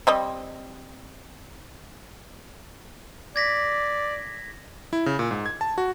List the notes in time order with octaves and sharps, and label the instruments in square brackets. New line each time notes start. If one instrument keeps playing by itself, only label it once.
[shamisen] G3 C4 D#5
[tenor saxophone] D5 [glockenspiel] G#6 A#6 B6
[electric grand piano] E4
C#3
A#2
G#2
G#6
A5
F#4